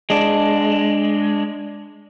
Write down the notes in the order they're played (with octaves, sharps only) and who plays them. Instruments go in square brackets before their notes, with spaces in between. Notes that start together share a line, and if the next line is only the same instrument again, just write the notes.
[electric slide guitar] G#3 D4